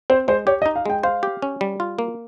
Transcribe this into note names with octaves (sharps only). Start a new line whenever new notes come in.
C4 C5
G#3 C5
G4 C#5
D#5
D#4
F5
G#3 G5
C5 F5
G4
C#4
G3
F4
A#3